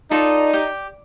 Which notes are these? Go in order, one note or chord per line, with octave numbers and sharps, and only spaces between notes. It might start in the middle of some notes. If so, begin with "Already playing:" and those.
D#4 F4 A4 D5
G4